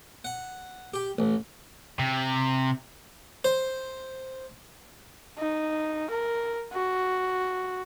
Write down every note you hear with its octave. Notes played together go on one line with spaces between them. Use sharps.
F#5
G4
A1
C3
C5
D#4
A#4
F#4